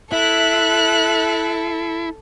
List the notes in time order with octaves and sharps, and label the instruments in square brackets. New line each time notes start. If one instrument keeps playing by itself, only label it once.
[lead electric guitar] E4 [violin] A4 [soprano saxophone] E5 [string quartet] F#6